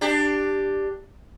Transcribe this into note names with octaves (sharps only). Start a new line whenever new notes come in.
D4 G4